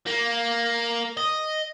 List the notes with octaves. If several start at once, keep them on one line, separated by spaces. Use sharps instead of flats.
A#3
D#5